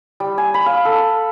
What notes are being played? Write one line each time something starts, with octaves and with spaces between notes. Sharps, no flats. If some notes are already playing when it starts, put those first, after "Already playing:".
G3
G#5
B5
F5
A4